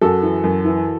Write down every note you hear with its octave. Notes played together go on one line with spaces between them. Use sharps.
F#2 F#4 A4
E3
F#2
E3